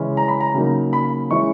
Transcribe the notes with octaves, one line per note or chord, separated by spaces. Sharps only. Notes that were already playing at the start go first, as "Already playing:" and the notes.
Already playing: C#3 E3 G#3 C#4 E4
A#5
B5
A#5
C#3 F#3 A#3 D#4
B5
E3 G#3 C#4 E4 C#6